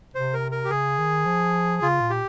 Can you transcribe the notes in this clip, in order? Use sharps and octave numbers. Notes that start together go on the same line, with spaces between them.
C3 C5
A#4
A#4
G4
C#3 G#4
D#3
F3
C#3 F4
A#2
G4